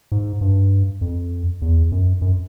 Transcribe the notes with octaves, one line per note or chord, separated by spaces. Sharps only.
G#2
G2
F2
E2
F#2
F#2